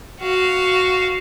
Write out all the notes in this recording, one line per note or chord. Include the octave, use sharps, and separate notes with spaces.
F#4 F5